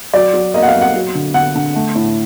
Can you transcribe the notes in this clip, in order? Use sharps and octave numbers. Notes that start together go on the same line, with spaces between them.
F#3 D5
F#3
A#3 D#5
F#5
F5
F#3
F#5
F#3
D3
D3 F#5
D3
A3
A2